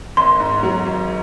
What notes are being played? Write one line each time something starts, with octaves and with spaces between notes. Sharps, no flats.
G#1 C6
G#2
F#3
G#1